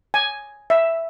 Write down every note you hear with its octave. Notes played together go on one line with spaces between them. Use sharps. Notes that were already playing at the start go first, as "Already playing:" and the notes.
G#5
E5